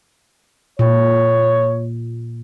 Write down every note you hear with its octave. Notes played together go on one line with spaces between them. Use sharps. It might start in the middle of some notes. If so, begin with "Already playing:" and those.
A#2 C#5